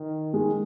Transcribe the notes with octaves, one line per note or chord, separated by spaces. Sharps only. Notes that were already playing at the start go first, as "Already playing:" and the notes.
Already playing: D#3
G#3